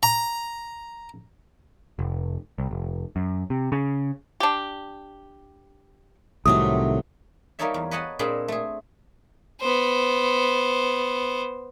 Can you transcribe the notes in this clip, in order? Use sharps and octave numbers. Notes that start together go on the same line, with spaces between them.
A#5
F1
C2
F1
F#2
C3
C#3
D4 G4
C2 A2 C3 D#3 F#3 A3 D#6
G3 A#3 D#4 A4 C#5 E5
E2
B4 C#5 D#5 F#5 G#5 A5
A#2 G#3 C4 D4 G#4 B5
A3 G#4
B3 C5